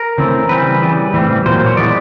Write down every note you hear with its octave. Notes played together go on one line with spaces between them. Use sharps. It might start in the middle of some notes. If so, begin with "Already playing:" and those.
Already playing: A#4
C#3 E3 A3 C4
E3 G3 C4 B4
C#3 E3 G3
A2 E3 G3 C4
A#2 F#3 A#3 C5
C#5
E3 G#3 B3 D5